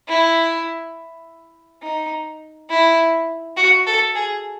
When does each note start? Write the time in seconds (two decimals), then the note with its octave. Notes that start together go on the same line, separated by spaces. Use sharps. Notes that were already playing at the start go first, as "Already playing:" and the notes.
0.08 E4
1.83 D#4
2.70 E4
3.57 F#4
3.86 A4
4.15 G#4